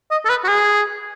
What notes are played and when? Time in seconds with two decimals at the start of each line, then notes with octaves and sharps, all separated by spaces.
0.11 D#5
0.25 A4
0.29 B4
0.44 F#4
0.48 G#4